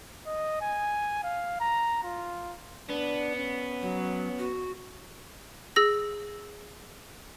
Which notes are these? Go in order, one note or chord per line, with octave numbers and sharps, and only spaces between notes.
D#5
G#5
F5
A#5
F4
B3 D4
C#4
F#3
F#4
G#4 E6 A#6